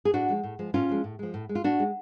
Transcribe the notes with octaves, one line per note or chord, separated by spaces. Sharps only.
G#4
A2 D4 F#4
F3 G#3
A2
F3 G#3
A2 C#4 F4
F3 G#3
A2
F3 G#3
A2
G#3
F4
A2 D4 F#4
G#3